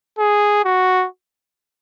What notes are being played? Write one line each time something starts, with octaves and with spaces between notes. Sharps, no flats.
G#4
F#4